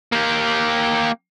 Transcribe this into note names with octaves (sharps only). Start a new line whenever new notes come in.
A#3 G4